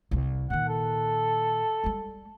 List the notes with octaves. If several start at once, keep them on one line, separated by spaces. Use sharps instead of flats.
C2 C3
A#2 D#3 F#5
A4
G3 G#3